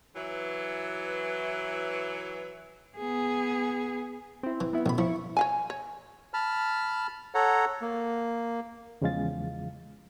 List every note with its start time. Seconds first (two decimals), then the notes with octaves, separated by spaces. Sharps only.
0.15 E3 F#3 E4 B4
2.97 B3 G#4
4.43 C4 E4
4.61 E3
4.73 B3 E4
4.86 A1 B2 B5
4.98 F3 E4 C#6
5.37 C#5 F5 G#5
5.70 C#5
6.34 A5 B5 F6
7.35 A4 C#5 F#5 A#5
7.82 A#3
9.01 E2 C#3 F3 G#3 F5 A6